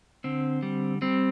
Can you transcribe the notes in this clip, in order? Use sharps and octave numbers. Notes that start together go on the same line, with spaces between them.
D3 C4
G3
G3 C4